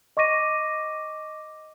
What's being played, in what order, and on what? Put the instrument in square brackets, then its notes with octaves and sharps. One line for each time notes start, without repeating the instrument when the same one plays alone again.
[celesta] D#5 C#6 D6 A#6 D#7